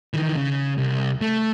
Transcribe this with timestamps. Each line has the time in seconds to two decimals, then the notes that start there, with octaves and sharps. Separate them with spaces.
0.14 D#3 E3
0.36 C#3
0.78 C2
1.21 A3